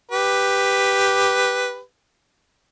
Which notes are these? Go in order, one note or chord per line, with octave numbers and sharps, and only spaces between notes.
G4 B4